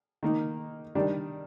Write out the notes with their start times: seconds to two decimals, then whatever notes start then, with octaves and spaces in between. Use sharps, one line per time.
0.23 D#3 A#3 D#4
0.95 D#3 G3 D4